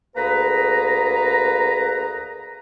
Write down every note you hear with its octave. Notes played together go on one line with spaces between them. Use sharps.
D2 A#3 G#4 B4 A#5